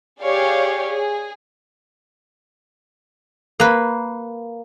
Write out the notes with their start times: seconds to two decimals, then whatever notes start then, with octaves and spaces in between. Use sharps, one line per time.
0.23 G4 G#4 C#5 D5 F5
0.88 G#4
3.60 A#3 B4